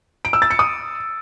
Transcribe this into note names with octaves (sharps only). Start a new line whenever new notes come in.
D7
E6
A6
C#7
D#6